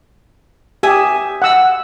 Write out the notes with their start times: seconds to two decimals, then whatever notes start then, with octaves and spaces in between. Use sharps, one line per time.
0.83 G4 E5 G#5 D#6
1.42 F#5 E6